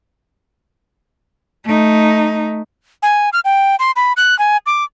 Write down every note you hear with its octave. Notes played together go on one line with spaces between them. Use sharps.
A3 D#4
G#5
F6
G5
C6
B5
F#6
G#5
D6